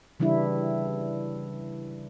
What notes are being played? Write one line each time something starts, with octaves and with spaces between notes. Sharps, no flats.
C#3 E3 G3 D4 E4